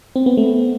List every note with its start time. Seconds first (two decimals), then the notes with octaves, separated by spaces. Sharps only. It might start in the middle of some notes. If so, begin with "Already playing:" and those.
0.16 C4
0.26 B3
0.37 A3